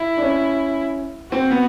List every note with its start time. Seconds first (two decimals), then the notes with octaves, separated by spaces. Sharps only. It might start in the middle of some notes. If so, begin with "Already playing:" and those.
Already playing: E4
0.17 D4
0.22 C#4
1.31 C4 F#4
1.51 B3